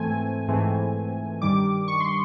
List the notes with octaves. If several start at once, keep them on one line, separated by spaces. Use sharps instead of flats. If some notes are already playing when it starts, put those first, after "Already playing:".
Already playing: G#2 E3 A3 C4 G#5
G#2 E3 A3 C4
G2 D#3 G3 D6
C#6
C6